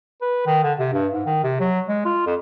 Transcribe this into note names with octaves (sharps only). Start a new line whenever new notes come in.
B4
D#3
D3
C3
G2
G#2
D#3
C3
F#3
G#3
F4
F2